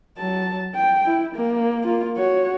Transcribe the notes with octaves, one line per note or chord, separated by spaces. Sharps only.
F#3 A5
G5
E4
A#3
A#3 F4
F#4 C#5